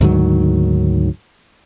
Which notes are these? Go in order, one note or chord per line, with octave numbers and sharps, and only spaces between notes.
D2 G#2 D#3 F#3